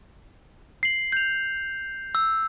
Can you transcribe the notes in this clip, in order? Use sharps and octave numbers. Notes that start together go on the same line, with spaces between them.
C7 F#7
G6 F7
E6